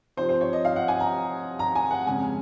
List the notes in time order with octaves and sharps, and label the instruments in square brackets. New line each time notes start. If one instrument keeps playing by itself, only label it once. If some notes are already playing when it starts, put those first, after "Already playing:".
[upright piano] C3 F3 C4 C5
C5
C#5
D#5
F5
F#5
G#5
A#5
A#5
G#5
F#5
F2 C#3 G#3 C#4 G#5